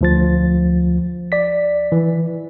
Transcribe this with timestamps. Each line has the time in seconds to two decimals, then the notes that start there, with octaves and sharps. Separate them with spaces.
0.01 D2 F3 A6
1.32 D5 B6
1.92 E3